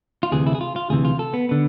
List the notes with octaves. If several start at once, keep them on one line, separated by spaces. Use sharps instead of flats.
F4
D2 C3 E3 G#4
E4
G#4
F4
F4
D2 C3 E3 G#4
F4
A4
B3
D3 B3